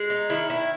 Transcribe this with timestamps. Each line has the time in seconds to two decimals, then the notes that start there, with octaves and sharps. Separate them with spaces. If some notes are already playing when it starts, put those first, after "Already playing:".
Already playing: G#3
0.10 D#4
0.30 D#3 E4
0.50 E4